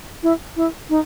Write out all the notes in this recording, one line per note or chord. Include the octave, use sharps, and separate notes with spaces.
E4
E4
D#4